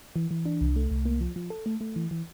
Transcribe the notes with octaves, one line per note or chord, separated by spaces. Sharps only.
E3
E3
D4
C2
A3
C2
A#3
F3
F3
A4
A3
A3
E3
E3